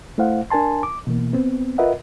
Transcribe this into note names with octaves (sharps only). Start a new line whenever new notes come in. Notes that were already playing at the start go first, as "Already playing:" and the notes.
A3 E4 C5 F5 F#5
D4 A#4 G#5 A5 C6
D6
B2 E3 A#3
B3 C4
F4 A#4 B4 D#5 E5 F#5